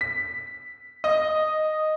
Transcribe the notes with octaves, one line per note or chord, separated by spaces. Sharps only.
B6
D#5